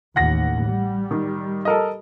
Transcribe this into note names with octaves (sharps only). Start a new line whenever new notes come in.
A1 D#2 F#5 A#6
G3
D#3
A4 A#4 D#5